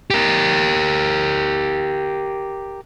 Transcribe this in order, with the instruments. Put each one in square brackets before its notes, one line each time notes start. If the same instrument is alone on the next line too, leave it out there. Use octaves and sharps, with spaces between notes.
[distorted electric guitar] G4 A#4